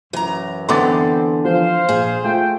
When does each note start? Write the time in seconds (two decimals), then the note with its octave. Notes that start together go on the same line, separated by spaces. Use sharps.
0.13 F#2 E3 A#5
0.69 D3 E3 B3 C4 C6 D6 A6
1.45 F3 C5 F5
1.89 A#1 G#4
2.24 A3 F4 G5